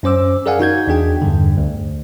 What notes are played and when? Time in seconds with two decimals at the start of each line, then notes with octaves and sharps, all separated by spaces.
0.03 F#2 C#4 C5 D6 E6
0.46 G#4 A#4 D5 F5 F#5 G#5
0.59 D#4 F#4 G6 G#6
0.87 E2 D4 G#4 G5
1.22 E2 G2 D3
1.57 D2